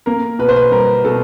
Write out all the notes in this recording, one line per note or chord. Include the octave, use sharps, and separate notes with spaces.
A#3 A#4
B2 B4
C5
B4
G3 A#4
B2 A4